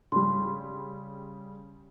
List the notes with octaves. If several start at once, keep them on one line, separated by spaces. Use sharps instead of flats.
C#3 G3 C6